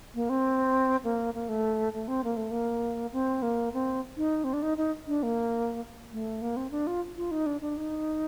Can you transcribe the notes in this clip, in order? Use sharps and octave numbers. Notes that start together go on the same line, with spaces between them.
A#3
C4
A#3
A#3
A3
A3
C4
A#3
A3
A#3
C4
A#3
C4
D#4
C4
D4
D#4
D#4
D4
A#3
A3
A#3
C4
D4
F4
F4
D#4
D4
D4
D#4